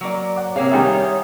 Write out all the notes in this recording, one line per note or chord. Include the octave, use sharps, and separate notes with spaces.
F#3 A#3 D5
C#5 F#5 D6
C3 A#3 C4 G#4 C#5 F5
D#3 G3 G#3 E5 F#5 G#5
F5